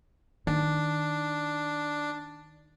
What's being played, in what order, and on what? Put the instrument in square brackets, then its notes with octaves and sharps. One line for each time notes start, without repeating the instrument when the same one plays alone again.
[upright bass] D#3 [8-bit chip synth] D4